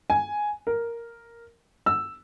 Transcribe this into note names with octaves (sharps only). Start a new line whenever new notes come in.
G#5
A#4
E6